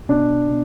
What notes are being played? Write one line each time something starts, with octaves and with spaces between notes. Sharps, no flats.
B2 D4
B2